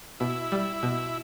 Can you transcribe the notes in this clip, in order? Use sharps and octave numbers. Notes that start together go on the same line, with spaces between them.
B2 E4
G3
B2